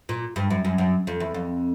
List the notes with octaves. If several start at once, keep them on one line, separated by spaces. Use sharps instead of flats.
A#2
G2
F#2
F#2
F#2
F2
E2
F2